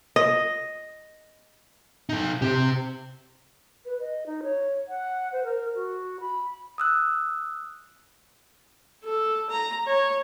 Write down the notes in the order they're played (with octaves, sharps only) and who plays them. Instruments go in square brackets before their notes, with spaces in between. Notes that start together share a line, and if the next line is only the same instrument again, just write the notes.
[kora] D#5
[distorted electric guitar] D#4 A4
[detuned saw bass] C3 [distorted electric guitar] G4 C5
[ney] B4
D#5
D#4
C#5
F#5
C5
A#4
F#4
B5
[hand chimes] D#6 E6 F#6
[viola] A4
A#5
C#5